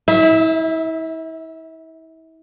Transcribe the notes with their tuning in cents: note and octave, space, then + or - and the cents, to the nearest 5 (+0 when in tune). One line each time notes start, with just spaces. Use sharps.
E4 -35 E5 +0